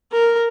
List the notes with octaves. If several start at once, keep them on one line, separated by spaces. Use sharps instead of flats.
A#4